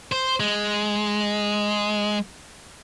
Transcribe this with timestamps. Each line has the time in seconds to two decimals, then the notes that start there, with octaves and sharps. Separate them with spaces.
0.12 C5
0.40 G#3